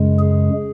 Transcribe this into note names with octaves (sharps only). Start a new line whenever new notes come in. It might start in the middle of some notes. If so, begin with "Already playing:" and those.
Already playing: F#2 C#3 G#3
G#4